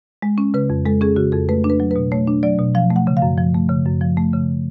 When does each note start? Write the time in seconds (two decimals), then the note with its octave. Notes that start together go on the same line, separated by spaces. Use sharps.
0.22 G#3
0.38 C#4
0.54 C#3 B4
0.70 F2
0.85 G#3 A4
1.01 C#4 G#4
1.16 C#3 F#4
1.32 F2 A4
1.49 A3 B4
1.64 D4
1.70 B4
1.80 F#3
1.91 B2 B4
2.12 A3 C#5
2.27 D4
2.43 F#3 D5
2.59 B2
2.75 F3 F5
2.91 A3
2.96 F#5
3.07 C#3
3.17 F5
3.22 F#2
3.38 F3
3.54 A3
3.69 C#3
3.86 F#2
4.01 F3
4.17 A3
4.33 C#3